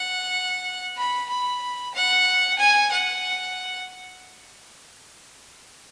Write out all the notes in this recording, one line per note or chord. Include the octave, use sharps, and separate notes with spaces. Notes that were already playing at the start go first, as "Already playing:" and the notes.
Already playing: F#5
B5
B5
F#5
G#5
F#5